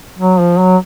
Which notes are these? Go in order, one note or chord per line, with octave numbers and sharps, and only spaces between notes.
F#3
F3
F#3